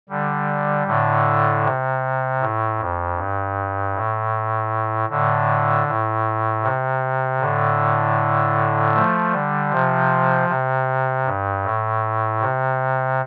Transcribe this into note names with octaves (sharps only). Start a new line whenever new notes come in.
D3 G3
A2 D3
C3
A2
F2
G2
A2
A2 D3
A2
C3
A2 D3
F3 A3
D3 G3
C3 F3
C3
G2
A2
C3